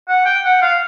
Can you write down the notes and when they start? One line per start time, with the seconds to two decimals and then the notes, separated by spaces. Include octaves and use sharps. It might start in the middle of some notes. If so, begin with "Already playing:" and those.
0.09 F#5
0.26 G5
0.45 F#5
0.62 F5